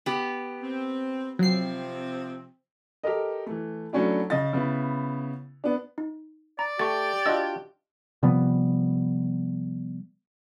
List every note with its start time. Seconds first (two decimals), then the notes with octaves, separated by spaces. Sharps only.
0.06 B3 G4
0.62 C4
1.39 C3 F3 F#3 C4 C7
3.04 G4 A4 A#4 D#5
3.46 E3 A3
3.93 F#3 A3 C#4 D4 E4
4.30 C#3 D#5 A6
4.53 C#3 B3 E4
5.64 B3 D4
5.98 D#4
6.59 D5 A#5
6.79 A3 G4 C#6 A6
7.26 D4 F4 F#4 D#5 E6
8.23 C3 F3 G3 B3